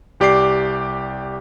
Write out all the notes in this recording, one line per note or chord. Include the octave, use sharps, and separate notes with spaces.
C2 G4 D5 D6 C7